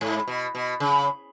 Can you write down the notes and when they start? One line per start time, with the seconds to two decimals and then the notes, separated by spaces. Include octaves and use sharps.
0.01 G#2
0.28 B2
0.55 B2
0.80 C#3